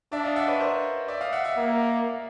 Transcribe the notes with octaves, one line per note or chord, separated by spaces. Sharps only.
D4 D5 E5
D#5 F5
E5 F#5
B4 C#5
A#4 C5
D5 E5
D#5 F5
E5 F#5
E5 F#5
A#3